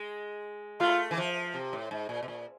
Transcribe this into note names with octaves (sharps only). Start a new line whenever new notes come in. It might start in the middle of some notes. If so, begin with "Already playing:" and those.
Already playing: G#3
A3 F4
E3
F3
C3
A2
G#2
A#2
B2
A#2